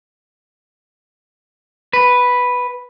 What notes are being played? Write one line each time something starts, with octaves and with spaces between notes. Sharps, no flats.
B4